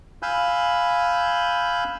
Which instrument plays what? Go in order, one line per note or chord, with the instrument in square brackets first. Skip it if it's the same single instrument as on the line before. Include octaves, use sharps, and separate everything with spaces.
[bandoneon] F5 G#5 B5 E6 F#6 G6